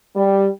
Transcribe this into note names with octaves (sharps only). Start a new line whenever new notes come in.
G3